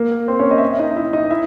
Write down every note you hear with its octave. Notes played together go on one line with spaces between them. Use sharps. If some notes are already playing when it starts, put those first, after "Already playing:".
Already playing: A#3 A#4
C4 C5
C#4 C#5
D#5
E5
D#5
E5
D#4 D#5
E4 E5
D#4 D#5
E4 E5